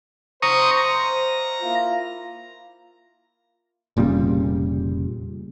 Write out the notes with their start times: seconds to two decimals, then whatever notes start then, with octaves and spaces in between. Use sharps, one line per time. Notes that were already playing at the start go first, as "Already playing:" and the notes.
0.42 C5 A#5 C#6 D#6
0.77 A#5
1.61 A#3 E4 F4
3.97 F1 A#2 C#3 G3